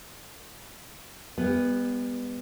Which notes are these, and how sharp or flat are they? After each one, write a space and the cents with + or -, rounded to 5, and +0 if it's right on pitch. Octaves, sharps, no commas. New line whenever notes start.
G3 +45 B3 +0